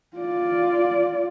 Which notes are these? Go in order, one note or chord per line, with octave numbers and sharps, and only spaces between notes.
F4 D5